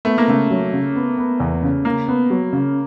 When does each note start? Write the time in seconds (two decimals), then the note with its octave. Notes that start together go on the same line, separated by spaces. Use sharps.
0.05 A3 B3
0.18 A#3
0.28 C#3 A3
0.51 F#3
0.73 C#3
0.95 B3
1.18 B3
1.40 E2
1.63 C#3
1.85 C#3 A#3
2.08 B3
2.30 F#3
2.53 C#3